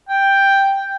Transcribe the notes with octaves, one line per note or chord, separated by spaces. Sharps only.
G5